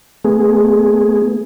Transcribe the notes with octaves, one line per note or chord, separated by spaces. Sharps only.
A3 B3 G#4